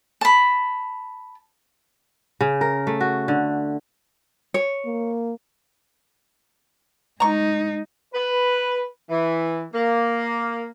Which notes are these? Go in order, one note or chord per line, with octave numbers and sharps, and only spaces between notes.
A5 B5
C#3
A#4
A3
F#4
D3
C#5
A#3
G#3 D#4 A#5 C#6
B4
E3
A#3